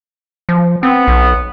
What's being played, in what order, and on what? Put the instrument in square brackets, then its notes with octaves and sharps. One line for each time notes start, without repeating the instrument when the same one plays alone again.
[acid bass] F3
[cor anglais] B3 [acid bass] C4
[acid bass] B1